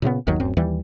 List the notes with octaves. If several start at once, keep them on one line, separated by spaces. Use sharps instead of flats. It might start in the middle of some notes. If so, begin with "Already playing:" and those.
A#2 C#3 A3 B3
G1 D#2 D#3 F#3
D1 F#2 C4
D#2 E3 G3